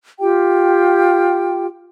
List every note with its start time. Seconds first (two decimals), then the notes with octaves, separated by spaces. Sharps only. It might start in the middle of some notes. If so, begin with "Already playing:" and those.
0.20 F4 G4 G5